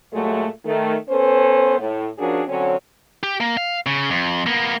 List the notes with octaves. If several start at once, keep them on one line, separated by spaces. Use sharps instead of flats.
A#2 F#3 G#3 A3
D#3 A3
B3 C#4 A4 B4 C5
A2
F3 C#4 D4 F#4 G#4 A#4
D3 F#3 C4 C#4
G4
A#3
F5
C#3
F2
A#3 B3